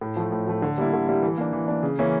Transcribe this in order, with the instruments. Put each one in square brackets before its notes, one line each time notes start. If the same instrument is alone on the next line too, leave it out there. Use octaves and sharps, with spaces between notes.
[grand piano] A2
F3 A3
A2
F3 A3
D3
G3 A#3 E4
D3
G3 A#3 E4
E3
A#3 D4
E3
A#3 D4
C#3
E3 A#3 C#4 E4